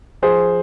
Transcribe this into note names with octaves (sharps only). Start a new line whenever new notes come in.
F3 G#4 C5